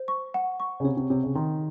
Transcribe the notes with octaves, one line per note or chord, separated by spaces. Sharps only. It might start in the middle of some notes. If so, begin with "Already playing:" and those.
Already playing: C5
C#6
F#5
C#6
C#3
C3 C#5
C3
C3 C#5
C#3
D#3 C6